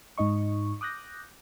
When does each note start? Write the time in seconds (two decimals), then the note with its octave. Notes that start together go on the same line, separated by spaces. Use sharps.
0.18 G#2 D#4 D#5 C#6
0.81 D6 D#6 F#6 G6 A#6